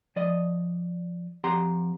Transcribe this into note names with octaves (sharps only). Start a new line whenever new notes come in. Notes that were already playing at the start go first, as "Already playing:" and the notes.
F3 D5 D#5
F2 G4 F#5 A#5 C6